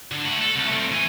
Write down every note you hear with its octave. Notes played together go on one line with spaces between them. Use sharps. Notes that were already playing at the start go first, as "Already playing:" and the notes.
D3
A3 F#5
A4
C2
A3 C4
E3 G#5